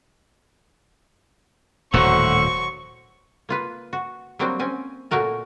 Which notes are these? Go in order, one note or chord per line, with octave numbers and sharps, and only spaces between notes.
D#1 A2 D3 F#3 A3 F#4 C5 C#6
A#3 F4 B4
F#4
F#3 G3 A#3 C4 D4 F#4
C4 C#4 G#5
A#2 A3 F#4 A#4 A5